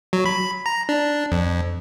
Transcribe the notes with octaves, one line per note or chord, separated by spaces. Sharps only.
F#3
B5
A#5
D4
F2